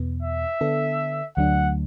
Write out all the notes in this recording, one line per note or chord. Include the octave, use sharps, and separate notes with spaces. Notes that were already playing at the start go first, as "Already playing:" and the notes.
Already playing: E2 B2 B3
E5
D3 B3 D4 A4
D2 D3 F#3 A3 D4 F#5